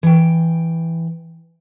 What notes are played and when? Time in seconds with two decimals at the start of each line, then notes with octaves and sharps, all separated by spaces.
0.03 E3 G5